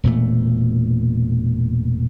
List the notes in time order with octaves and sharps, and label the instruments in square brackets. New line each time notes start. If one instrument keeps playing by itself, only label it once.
[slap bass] E1 A#2 A3